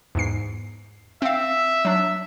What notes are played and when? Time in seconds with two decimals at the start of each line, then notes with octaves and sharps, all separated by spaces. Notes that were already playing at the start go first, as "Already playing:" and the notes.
0.15 E2 G#2 C7
1.22 C4 E5 F5
1.85 F#3 D4